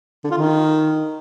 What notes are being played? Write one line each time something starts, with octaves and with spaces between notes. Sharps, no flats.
D3
F4
D#3